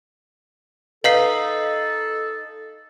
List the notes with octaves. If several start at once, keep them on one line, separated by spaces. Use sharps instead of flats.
D#4 A4 B4 F5 C7